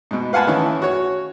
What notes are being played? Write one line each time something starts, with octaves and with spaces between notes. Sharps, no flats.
G#2 B2
B4 F5 F#5 G#5 A5 B5
D#3 E3 C#4 E4
F#4 C#5